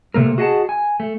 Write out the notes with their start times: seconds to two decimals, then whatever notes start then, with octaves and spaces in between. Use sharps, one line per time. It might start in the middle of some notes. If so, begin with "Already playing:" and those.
0.14 C3 A3 A#3 A#4
0.38 F#4 G#4 D#5 F#5 A5
0.69 G#5
1.00 A3